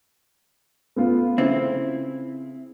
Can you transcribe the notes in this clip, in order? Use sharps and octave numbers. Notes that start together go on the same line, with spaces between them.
A3 B3 F4
C#3 C4 E4